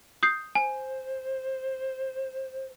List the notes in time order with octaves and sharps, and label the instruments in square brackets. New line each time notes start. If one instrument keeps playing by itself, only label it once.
[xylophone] D#6 G6 C7
[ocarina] C5 [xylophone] G#5